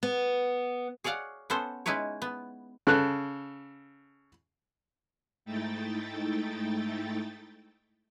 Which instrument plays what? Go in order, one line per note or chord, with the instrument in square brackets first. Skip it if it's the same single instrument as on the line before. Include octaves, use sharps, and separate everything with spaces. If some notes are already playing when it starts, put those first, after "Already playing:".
[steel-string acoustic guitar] B3
[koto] G#4 C#5 D5 F5 F#5
B3 C#4 A4 C5
G#3 C#4 D#4 E4 B4 C#5
B3
[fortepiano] C#3 A4 F#6
[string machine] G#2 A3 D#4 E4 G5 A6